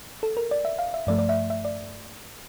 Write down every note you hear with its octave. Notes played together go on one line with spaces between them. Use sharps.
A4
A#4
D5
E5
F5
E5
G2 F3 A3 D5
D5
E5
E5
D5